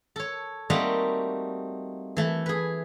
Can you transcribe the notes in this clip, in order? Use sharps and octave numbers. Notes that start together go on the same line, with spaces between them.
A4 C#5
G3 A3 A#3 C4 D#4 F#4
E3 A3
G#4 B4